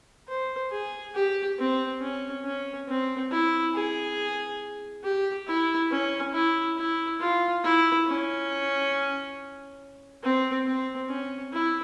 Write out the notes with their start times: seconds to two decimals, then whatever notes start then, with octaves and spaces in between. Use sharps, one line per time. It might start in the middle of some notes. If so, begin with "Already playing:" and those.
0.28 C5
0.72 G#4
1.15 G4
1.59 C4
2.01 C#4
2.45 C#4
2.88 C4
3.32 E4
3.75 G#4
5.04 G4
5.47 E4
5.91 C#4
6.34 E4
6.78 E4
7.21 F4
7.64 E4
8.07 C#4
10.23 C4
10.67 C4
11.09 C#4
11.53 E4